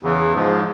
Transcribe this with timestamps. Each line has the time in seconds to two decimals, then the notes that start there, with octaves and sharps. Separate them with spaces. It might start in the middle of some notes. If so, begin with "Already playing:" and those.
0.03 E2 C#3 E3
0.33 G#2 F3 G#3